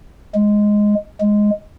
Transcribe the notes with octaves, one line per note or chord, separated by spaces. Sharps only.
G#3
G#3